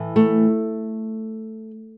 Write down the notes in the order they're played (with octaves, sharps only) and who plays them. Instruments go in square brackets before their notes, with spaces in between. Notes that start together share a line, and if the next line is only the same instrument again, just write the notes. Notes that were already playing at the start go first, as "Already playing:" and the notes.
Already playing: [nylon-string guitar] A2 E3
A3